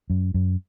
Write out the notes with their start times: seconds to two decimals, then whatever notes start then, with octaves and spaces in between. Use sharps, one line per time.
0.10 F#2
0.34 F#2